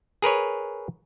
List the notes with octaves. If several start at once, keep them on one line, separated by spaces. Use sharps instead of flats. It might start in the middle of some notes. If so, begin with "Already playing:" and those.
G#4 A#4 B4 C#5